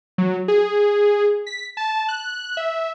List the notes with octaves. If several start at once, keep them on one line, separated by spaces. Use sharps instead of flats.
F#3
G#4
B6
A5
F#6
E5